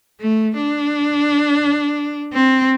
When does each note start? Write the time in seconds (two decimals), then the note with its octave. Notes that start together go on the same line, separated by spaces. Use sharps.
0.20 A3
0.56 D4
2.33 C4